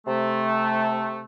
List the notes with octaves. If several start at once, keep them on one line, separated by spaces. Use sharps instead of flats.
C3 A3